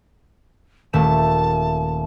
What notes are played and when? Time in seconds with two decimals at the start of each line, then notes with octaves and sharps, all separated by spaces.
0.93 D#1 A3 A5 E7